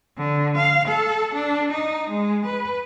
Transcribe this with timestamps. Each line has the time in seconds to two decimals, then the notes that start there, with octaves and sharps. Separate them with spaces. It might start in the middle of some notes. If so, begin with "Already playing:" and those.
0.18 D3
0.58 F5
0.88 A4
1.34 D4
1.71 D#4
2.10 G#3
2.46 B4